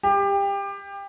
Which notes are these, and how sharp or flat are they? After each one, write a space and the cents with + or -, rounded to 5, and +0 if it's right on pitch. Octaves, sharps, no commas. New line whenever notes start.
G4 +25